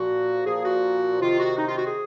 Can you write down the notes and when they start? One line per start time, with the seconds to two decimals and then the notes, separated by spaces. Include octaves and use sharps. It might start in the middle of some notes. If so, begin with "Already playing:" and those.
Already playing: A#2 F3 F#4
0.46 A#2 F3 G#4
0.65 F#4
1.20 C3 D#3 F4
1.40 F#4
1.58 D#4
1.67 F4
1.77 F#4
1.86 G#4